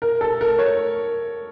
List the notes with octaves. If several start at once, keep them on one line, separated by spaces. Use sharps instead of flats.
A#4
A4
A#4
C#5